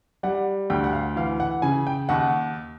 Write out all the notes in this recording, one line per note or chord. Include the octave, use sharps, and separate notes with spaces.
G3 F#5
D2 G5
F#5
F5
E3 F5
F#5
C#3 G#5
G5
D#2 F#5